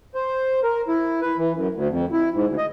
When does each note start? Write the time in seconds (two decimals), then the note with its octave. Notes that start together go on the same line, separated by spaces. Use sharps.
0.15 C5
0.63 A#4
0.88 E4
1.21 B4
1.38 E3
1.55 F#2
1.75 D2
1.89 F2
2.13 E4
2.33 G#2
2.46 D2
2.58 D#5